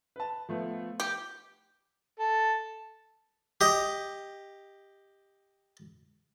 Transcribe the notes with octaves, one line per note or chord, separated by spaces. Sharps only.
B4 A5
F3 A3 B3
G4
A4
G4 D#5